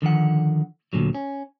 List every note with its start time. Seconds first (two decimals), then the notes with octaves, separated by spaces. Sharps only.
0.02 D3 D#3 F3 F#5
0.93 D2 G2 A#2 D3 F#3
1.14 C#4